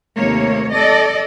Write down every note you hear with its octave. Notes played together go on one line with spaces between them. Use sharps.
D#2 C3 A3 A#3 C#5
A4 D5 D#5